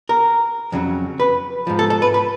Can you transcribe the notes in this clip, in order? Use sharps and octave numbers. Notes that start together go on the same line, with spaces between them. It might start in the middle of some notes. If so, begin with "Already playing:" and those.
A#4
F2 C#3 F#3
B4
G#2 F3
A4
A4
B4
B4